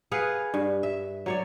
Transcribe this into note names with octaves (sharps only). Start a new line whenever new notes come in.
G#4 B4 F5 F#5
G2
E5
F#3 C#5 D5